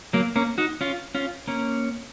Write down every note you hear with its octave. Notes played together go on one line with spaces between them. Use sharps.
F#3 A#3
A#3 C#4
D#4 F#4
C#4 F4
C#4 F4
A#3 C#4